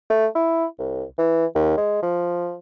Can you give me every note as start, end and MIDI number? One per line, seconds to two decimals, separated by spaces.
0.10 0.26 57
0.35 0.65 64
0.78 1.03 36
1.18 1.45 52
1.55 1.76 39
1.77 2.01 56
2.02 2.56 53